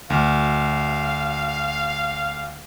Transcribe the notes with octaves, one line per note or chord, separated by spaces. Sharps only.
D2 F5 F6